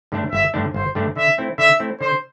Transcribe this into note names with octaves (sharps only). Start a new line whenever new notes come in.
G2 D3 A3 D4
G1 E5
G2 D3 A3 D4
G1 C5
G2 D3 A3 D4
D3 E5
A3 C4 E4
D3 E5
A3 C4 E4
D3 C5